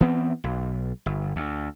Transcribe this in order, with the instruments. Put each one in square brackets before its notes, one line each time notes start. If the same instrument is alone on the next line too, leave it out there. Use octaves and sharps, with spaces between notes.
[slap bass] E3 B3 C4
B1
G1
D2